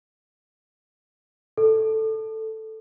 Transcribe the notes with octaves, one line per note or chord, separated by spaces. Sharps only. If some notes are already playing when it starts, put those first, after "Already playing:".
A4